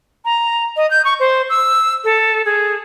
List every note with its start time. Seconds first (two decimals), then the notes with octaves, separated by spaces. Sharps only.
0.25 A#5
0.77 D#5
0.91 G6
1.05 C#6
1.20 C5
1.50 E6
2.04 A4
2.45 G#4